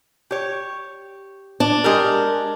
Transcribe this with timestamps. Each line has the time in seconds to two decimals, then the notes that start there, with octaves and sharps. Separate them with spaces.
0.31 G4 C#5
1.60 D4
1.84 G#3 G4 A#4